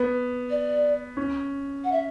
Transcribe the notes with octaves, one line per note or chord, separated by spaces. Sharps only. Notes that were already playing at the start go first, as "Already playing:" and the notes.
Already playing: B3
D5
C#4
F#5
E5